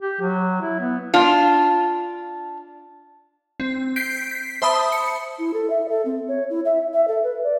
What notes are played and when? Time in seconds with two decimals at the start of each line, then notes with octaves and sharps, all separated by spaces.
0.01 G4
0.21 F#3
0.61 E4
0.80 B3
1.14 D4 F4
3.60 C4
3.96 G6 B6 C7 D7
4.31 B6 C7
4.62 C5 E5 A5 B5 D#6
4.92 C#7
5.39 E4
5.53 A4
5.70 E5
5.89 A4
6.05 C4
6.28 C#5
6.50 E4
6.65 E5
6.93 E5
7.08 A4
7.23 B4
7.43 D5